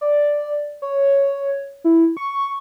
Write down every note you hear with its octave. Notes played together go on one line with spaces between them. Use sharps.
D5
C#5
E4
C#6